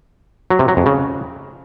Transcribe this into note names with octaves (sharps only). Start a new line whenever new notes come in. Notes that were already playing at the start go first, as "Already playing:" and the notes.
F#3
C3
F#3
F2
C#3